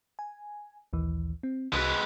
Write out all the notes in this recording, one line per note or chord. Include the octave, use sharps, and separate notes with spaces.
G#5
A#1 D#2 E3
C4
C2 G#3 F#4 B4